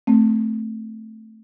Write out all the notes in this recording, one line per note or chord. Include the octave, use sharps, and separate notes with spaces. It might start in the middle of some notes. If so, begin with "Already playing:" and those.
A3 C4